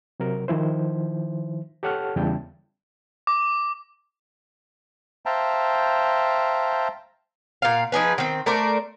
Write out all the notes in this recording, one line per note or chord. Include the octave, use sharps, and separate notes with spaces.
C3 F#3 A#4
D#3 F3 E4 C5
G4 A4 C#5 F#5 A5 F6
E2 C#3 G3 E4 G5 A5
D6
C5 E5 F5 G5 A5 A#5
A#2 F5
F3 D#4 G#4 B4
D#3 C4
A3 A#4 C5 D5